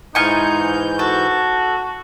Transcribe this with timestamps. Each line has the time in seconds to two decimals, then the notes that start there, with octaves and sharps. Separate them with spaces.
0.15 G#2 E3 D#4 F4 G#5 C#6 G6
0.99 F#4 A4